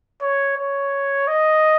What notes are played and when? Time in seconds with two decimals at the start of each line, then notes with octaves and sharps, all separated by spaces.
0.21 C#5
0.57 C#5
1.27 D#5